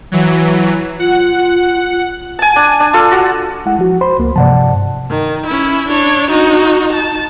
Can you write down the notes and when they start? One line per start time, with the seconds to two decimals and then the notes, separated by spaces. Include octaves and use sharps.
0.12 E3 F#3
0.99 F4 F#5
2.39 G#5 A5
2.56 D4
2.80 D4
2.93 F4 A4
3.12 F#4
3.66 G#3 E4 F#5
3.79 F3 F#4
4.01 C5 B5 C6
4.19 C#2 A#3
4.36 G2 C3 F3 D5 F#5 A5
5.10 D#3
5.46 C#4 E4
5.88 D4 C#5
6.30 D#4 F#4
6.93 A5